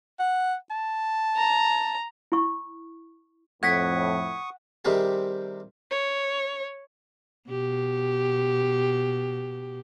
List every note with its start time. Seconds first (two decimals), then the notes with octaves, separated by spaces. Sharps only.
0.19 F#5
0.70 A5
1.36 A#5
2.32 E4 C#6
3.63 F2 A2 F#5 C#6 D#6 G#6 A#6 B6
4.85 C3 D#3 G3 C4 G4 G#4
5.91 C#5
7.50 B2 G4